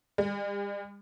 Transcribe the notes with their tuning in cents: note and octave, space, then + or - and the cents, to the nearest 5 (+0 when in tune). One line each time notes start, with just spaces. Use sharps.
G3 +45